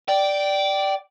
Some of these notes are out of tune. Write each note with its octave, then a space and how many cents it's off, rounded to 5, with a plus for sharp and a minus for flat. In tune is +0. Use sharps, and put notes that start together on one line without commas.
D5 +0 G5 -15